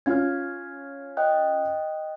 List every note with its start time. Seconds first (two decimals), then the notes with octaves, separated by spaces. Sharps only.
0.06 C#4 F4 F6 G#6
1.17 D#5 G5 F#6